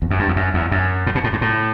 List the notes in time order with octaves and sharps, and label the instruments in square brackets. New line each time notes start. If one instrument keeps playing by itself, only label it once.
[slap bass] E2
F#2
G2
E2
F#2
E2
F#2
A2
B2
A2
G2
A2